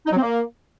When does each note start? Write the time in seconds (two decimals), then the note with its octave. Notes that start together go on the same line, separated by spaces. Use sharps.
0.06 D#4
0.11 F#3
0.17 C4
0.22 A#3